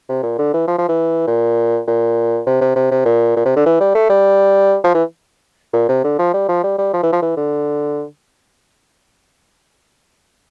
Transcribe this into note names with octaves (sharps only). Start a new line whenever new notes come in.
C3
A#2
D3
E3
F3
F3
E3
A#2
A#2
C3
C3
C3
C3
A#2
A#2
C3
D3
E3
G3
A3
G3
F3
E3
A#2
C3
D3
F3
G3
F3
G3
G3
F3
E3
F3
E3
D3